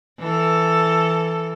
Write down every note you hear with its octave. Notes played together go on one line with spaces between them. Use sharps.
E3 A4